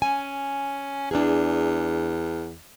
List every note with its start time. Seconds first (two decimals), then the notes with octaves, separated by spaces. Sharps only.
0.02 C#4 G#5
1.11 E2 D4 G#4